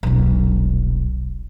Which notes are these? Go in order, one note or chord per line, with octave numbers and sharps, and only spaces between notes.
D#1 B1